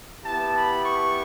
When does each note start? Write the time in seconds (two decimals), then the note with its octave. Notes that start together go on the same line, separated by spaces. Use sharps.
0.24 B3 E4 G4 A5
0.54 B5
0.84 C#6